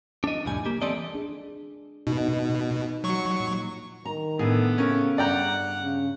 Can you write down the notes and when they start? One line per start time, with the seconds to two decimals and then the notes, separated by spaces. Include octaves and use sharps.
0.24 D4 D#5
0.45 C2 F2 A2 G3 G#5
0.66 A#3 G4
0.82 E3 G3 C4 A4 D5 D#5
1.15 D4 G#4
2.07 B2 D#4
3.04 F#3 C#6
3.40 A#2
4.05 D#3 A#5
4.39 A2 D3 B3 G#4 A4
4.78 C#3 C#4 A#4
5.18 G2 D5 F#5 G5 A#5
5.81 C#3